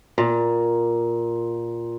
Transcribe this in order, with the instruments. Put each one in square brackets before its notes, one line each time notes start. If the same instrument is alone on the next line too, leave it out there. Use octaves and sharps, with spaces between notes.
[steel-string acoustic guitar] A#2